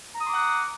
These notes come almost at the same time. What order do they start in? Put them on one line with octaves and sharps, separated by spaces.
A#5 D#6 C6 D6 F#5